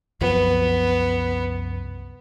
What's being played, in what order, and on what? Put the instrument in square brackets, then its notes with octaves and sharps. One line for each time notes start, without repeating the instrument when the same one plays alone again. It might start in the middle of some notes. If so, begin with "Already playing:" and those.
[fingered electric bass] C2 F#2 F3 [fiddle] B3